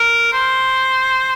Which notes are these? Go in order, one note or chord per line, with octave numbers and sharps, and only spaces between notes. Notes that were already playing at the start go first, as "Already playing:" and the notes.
Already playing: A#4
C5